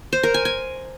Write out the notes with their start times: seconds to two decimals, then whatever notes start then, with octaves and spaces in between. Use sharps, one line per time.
0.13 C5
0.23 A#4
0.34 G#5
0.45 G#5